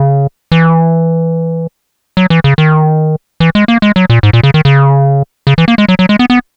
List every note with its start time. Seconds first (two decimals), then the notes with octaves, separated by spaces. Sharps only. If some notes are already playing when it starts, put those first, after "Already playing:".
Already playing: C#3
0.52 E3
2.17 F#3
2.30 E3
2.44 C#3
2.58 D#3
3.40 E3
3.55 G#3
3.68 A#3
3.82 G#3
3.96 F#3
4.10 A#2
4.23 G#2
4.33 A#2
4.43 C#3
4.54 D#3
4.65 C#3
5.47 C#3
5.58 E3
5.68 A#3
5.78 G#3
5.88 F#3
5.99 F#3
6.09 G#3
6.19 B3
6.30 B3